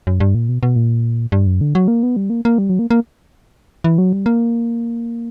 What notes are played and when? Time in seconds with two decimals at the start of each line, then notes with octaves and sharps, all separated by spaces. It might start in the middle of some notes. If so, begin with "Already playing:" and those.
0.07 F#2
0.20 G2
0.35 A#2
0.49 B2
0.63 B2
0.76 A#2
1.32 G2
1.47 F#2
1.61 D3
1.75 F#3
1.88 A#3
2.03 B3
2.17 G3
2.30 A#3
2.45 A#3
2.58 G3
2.70 F#3
2.79 A#3
2.91 A#3
3.84 E3
3.98 F#3
4.13 G3
4.26 A#3